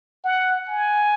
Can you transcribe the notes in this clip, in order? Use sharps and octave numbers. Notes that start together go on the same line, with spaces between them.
F#5
G#5